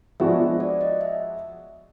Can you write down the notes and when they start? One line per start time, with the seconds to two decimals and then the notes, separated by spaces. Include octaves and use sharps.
0.20 F3 G#3 B3 D4 F#4 E5
0.60 D5
0.81 D#5
1.01 E5